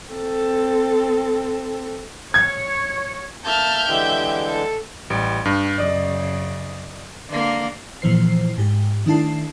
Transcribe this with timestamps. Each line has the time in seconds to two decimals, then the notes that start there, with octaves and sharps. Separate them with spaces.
0.13 C4 A4
2.34 C#5 G#6
3.45 A#3 E5 A5 F6 G6
3.88 D3 E3 G#3 G4
4.49 A4
5.10 A1 G3 D7
5.45 G2
5.78 F#2 C#3 D5 D#5
7.30 D3 A#3
8.02 A#2 E3 F3 C5 C7
8.58 G#2 G4
9.06 D#3 A3 D4 E4 A5 C7